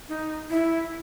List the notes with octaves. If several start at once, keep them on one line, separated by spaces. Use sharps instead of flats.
D#4
E4